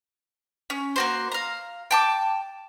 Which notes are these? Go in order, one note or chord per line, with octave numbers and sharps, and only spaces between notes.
C#4
A#3 F#4 C5
F5 A#5
G5 A5 D6